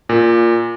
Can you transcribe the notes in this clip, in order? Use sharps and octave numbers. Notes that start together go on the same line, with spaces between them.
A#2